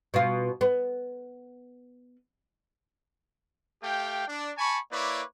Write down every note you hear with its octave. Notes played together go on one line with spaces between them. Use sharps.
B2 F4
B3
A3 G4 F5 G5
D4
G#5 A5 B5 C#6
A#3 E4 B4 C#5 D5 D6